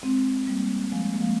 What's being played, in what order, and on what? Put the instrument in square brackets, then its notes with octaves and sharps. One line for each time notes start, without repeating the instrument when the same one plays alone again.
[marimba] G#3 C4
G3 A#3
F3 G#3
A#3
F3 G#3